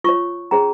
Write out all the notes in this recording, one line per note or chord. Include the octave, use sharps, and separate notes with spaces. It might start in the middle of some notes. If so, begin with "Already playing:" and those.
F4 C#5 C#6
C#4 G#4 C#5 A#5